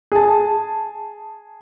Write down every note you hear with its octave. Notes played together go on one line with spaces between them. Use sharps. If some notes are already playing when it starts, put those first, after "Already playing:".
G#4 A5